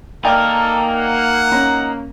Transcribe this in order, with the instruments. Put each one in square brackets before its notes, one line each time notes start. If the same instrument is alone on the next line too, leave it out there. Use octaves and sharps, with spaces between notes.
[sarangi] A#3 [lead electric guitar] D#4 A#4 [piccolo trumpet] A4 [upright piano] D5 G5 G#5
[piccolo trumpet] F#5
[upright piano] C#4 A#5